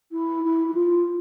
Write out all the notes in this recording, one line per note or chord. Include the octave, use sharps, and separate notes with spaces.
E4
E4
E4
F4